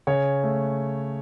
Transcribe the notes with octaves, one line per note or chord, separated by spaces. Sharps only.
C#3 C#5
A3